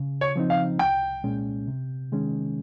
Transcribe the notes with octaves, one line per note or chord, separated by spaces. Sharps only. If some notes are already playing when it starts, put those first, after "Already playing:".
Already playing: C#3
C#5
F3 C4 D#4
F5
C2 G5
A#2 G#3 C#4
C3
D#3 G#3 C#4